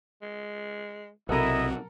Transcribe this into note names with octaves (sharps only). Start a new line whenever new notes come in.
G#3
B1 C3 E4 F#4 A4 A#4 D#5 A#5